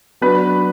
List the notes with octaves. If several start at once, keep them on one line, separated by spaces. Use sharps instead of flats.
F#3 B3 D4 F#4 B4